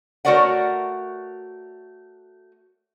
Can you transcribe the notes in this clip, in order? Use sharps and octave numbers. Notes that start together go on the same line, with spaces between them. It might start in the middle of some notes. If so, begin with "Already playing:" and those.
A3 F#4 A#4 C#5 D5 F#5